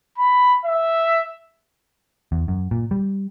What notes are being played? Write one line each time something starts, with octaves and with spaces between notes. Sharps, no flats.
B5
E5
E2
F#2
A#2
G3